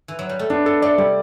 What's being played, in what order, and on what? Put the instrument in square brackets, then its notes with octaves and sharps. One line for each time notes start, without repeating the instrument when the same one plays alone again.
[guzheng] E3
F#3
G3
A3
[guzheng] B3 [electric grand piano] D4
[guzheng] B3 [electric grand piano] A4
[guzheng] A3 [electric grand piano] D5
[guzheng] C3 [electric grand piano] G3